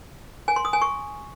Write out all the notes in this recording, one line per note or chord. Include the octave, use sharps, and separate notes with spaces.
G#5
C6
D#6
G#5
C#6